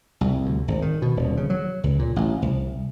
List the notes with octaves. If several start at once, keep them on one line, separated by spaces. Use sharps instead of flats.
C2
D2
G#1
D#3
B2
D#1
C#3
F#3
C#2
A#2
A1
C2